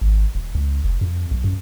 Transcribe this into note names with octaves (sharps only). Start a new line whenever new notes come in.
G#1
D#1
C#2
F1
F2
B1
F#2